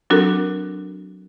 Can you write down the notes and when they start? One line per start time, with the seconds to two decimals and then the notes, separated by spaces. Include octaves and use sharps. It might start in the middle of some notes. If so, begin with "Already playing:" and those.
0.10 F#3 C4 D4 F#4 A4 A#4